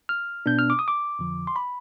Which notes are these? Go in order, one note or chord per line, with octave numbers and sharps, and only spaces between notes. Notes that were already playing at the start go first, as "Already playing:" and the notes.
F6
B2 B3 D4 G6
F6
D6
D#6
D6
F2 D3 F3
C6
B5